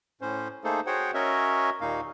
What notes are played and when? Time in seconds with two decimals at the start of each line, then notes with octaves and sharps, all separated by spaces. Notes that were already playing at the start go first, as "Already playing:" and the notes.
0.21 A2 C#4 C5
0.64 A3 A#3 D#4 G#4 A4 C5
0.87 F#4 G#4 C5 C#5 F#5 G5
1.14 C#4 F#4 A#4 C#5 D#5 E5
1.81 D#2 A#2 A#3 D#4 F5